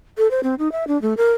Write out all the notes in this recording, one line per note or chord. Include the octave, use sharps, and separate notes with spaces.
A4
C5
C4
D#4
E5
D4
A3
A#4